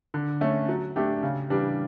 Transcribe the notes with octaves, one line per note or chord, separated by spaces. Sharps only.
D3
A3 C#4
F#3
A3 D4 G4
C#3
E3 G3 D4